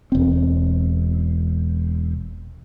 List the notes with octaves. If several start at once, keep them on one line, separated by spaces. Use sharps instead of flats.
E1 C4